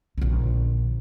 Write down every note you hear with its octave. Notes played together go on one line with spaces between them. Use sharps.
A#1 D3